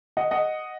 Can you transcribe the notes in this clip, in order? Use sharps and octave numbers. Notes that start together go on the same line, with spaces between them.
D#5 F#5
D#5 F#5